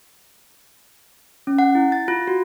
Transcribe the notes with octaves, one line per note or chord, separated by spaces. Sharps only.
C#4
F#5
E4
A6
F4
F#4